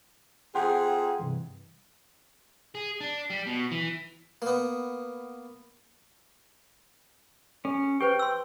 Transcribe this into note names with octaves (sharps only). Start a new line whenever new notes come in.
F2 G#4 F#5 G5 C6
G2 C3 E3
G#4
D4
G3
B2
E3
A#3 B3
C#4 A4
G4 B4 C5 G5
C6 E6